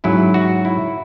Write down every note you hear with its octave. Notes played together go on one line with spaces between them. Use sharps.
G#2 F#3 C#4 E4
F#4
E4